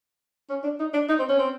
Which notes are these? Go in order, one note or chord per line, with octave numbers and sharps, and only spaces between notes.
C#4
D4
D#4
D4
D#4
C4
C#4
C4